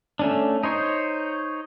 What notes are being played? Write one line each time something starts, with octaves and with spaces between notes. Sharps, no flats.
A3 C#4 D4
D#4 C5 C#5